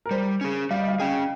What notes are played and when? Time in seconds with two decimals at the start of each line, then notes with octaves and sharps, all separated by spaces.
0.06 A#4
0.11 G3 C5
0.41 C#4 G#4
0.71 G3 F5
0.80 D#5
0.88 F5
1.00 C#4 G#4 G5